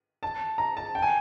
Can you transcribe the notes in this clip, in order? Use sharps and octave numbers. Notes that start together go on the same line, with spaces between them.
A5
A#5
A5
G5
G#5